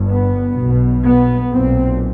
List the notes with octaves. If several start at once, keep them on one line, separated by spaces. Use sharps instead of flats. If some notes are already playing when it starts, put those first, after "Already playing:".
Already playing: G1 G2
B3
B1 B2
B3
B1 A#2 C4